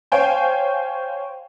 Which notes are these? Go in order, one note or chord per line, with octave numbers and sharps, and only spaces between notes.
C5 C#5 F5 G5 G#5